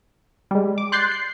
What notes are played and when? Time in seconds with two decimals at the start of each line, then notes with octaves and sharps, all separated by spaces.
0.51 G3 G#3
0.78 D6
0.92 C6 F#6 G6 A6 C7
1.11 C7